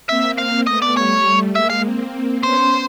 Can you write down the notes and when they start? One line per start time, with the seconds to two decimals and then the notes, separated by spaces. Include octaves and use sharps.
0.09 A#3 C4 E5
0.39 F5
0.67 A3 B3 D#5
0.82 D5
0.97 G3 A3 C#5
1.55 G#3 A#3 E5
1.70 F5
1.85 A#3 C4
2.43 B3 C#4 C5